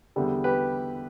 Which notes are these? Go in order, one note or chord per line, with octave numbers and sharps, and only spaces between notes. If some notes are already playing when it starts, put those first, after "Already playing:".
E2 D3 G3
G4 B4